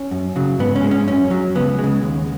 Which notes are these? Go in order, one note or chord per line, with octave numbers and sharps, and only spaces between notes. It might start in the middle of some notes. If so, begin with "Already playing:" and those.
Already playing: C#4
F#2
C#3 F#3
G#2 B3
C#4
G#3
C#4
F#2 C#4
F#3
C#2 B3
G#3
C#3
D#2